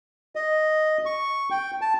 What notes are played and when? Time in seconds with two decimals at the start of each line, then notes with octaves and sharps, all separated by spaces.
0.36 D#5
1.06 C#6
1.51 G5
1.81 A5